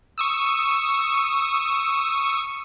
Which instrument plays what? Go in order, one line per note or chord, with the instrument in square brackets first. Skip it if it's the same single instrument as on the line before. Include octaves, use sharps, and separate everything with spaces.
[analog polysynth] C#6 D#6 E6